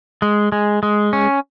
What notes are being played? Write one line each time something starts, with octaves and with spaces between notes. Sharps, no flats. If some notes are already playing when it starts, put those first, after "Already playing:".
G#3
G#3
G#3
C#4